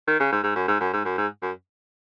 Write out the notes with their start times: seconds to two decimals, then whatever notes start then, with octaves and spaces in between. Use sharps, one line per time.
0.08 D#3
0.20 C#3
0.32 G#2
0.43 G#2
0.56 F#2
0.68 G#2
0.81 F#2
0.93 G#2
1.05 F#2
1.18 G#2
1.42 F#2